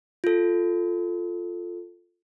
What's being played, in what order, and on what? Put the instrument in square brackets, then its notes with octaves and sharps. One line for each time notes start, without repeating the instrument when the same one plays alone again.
[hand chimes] F4 A4